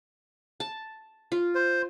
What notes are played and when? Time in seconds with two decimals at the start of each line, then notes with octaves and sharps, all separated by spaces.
0.60 A5
1.32 F4
1.55 C5